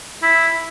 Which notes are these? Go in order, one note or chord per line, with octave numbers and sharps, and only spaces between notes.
E4